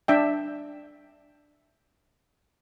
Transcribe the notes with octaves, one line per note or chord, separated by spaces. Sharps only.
D4 E5 G5